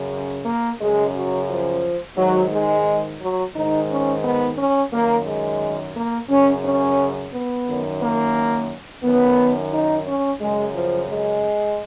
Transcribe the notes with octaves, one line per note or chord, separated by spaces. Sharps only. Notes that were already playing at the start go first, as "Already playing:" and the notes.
Already playing: F#2 C#3
A#3
F#2 C#3 G#3
F#3
F3
G#2 D#3 F#3
G#3
F#3
G#2 D#3 D#4
C#4
B3
C#4
F#2 D#3 A#3
G#3
A#3
F#2 C#3 C#4
C#4
B3
F#2 D#3
A#3
F#2 D#3 B3
D#4
C#4
F#2 C#3 G#3
F3
G#3